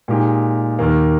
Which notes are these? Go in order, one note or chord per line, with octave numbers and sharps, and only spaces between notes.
A#2 G#3 D#4 G4
D#2 D#3 A#3